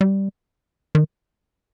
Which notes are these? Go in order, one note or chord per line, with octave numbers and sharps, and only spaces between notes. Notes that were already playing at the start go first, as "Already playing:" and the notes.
G3
D#3